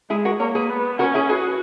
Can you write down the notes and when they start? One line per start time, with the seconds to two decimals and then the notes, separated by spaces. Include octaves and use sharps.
0.09 G#3 E4 G#4
0.25 F#4 A#4
0.40 A#3 A#4 C#5
0.55 G#4 B4
0.69 B3
0.99 C#4 F#4 A#4
1.14 E4 G#4
1.29 F#4 G#4 B4